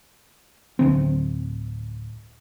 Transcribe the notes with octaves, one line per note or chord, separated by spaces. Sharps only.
D1 D3 C4